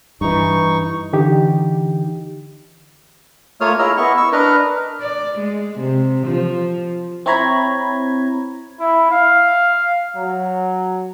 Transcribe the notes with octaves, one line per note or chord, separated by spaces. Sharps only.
G2 E3 D#4 C#6
D3 E3 D#4 G4
A3 A#3 F4 C#5 D#6 F6
E4 G#4 A#4 D#5 A#5 E6
B3 E4 D#5 C#6
C#6 E6
D4 A#4 B4 D#5 A#5 F6
D5
G#3
C3
F3
C4 E4 C#5 A#5 B5 G#6
E4
F5
F#3